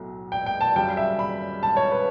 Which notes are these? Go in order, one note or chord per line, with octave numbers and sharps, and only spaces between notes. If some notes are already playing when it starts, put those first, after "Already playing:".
Already playing: B1 A2 F#3 A3
G5
G5
A5
F#2 C#3 G3 G5
E5
B5
A5
C#5
B4